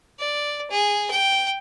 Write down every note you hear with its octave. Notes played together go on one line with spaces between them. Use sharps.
D5
G#4
G5